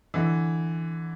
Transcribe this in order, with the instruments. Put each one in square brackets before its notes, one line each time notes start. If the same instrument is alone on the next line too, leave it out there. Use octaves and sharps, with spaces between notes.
[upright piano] D3 E3